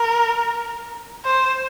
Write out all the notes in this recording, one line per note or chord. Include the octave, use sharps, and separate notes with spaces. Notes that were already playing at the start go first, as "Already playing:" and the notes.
Already playing: A#4
C5